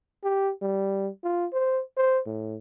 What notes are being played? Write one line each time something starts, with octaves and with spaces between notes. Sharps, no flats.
G4
G3
F4
C5
C5
A2